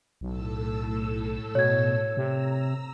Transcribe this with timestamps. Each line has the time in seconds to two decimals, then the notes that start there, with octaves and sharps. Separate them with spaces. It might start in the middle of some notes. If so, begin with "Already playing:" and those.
0.21 B1 A2 A4 E6
1.55 B2 C#5 G#6
2.17 C3 A#5 E6